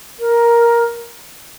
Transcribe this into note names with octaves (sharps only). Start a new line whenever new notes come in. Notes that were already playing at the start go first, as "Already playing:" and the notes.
A#4